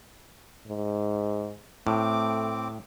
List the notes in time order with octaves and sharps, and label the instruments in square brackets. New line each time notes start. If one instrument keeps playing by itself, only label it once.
[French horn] G#2
[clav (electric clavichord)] A2 [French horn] A3 [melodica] C4 D6